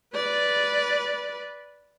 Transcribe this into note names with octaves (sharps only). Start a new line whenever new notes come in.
B4 D5